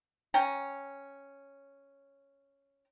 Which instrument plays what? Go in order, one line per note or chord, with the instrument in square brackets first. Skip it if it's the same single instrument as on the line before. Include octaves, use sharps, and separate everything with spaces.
[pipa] C#4 G5 A#5